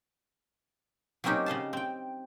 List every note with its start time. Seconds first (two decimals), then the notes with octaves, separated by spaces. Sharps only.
1.24 F#3 A#3 C4 C#4 D#4 G4
1.46 C#3 D#5 F5 A5
1.73 C4 G5